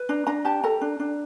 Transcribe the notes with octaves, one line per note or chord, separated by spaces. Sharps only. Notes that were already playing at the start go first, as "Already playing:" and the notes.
Already playing: B4
D4 A#5
D4 A#5
G4 A5
A4 A#5
D4
D4